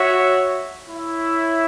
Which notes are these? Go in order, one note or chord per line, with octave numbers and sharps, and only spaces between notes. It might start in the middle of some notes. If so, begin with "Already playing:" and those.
Already playing: F#4 C#5 E5
E4 C#5 E5